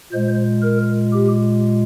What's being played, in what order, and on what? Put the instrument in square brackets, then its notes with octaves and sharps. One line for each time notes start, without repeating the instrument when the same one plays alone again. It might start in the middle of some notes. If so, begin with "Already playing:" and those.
[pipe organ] A#2 G#3 C5
A#4
G4